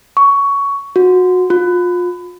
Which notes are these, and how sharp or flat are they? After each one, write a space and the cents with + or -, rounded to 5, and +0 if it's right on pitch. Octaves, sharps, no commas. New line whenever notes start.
C#6 +15
F#4 -20
F4 +30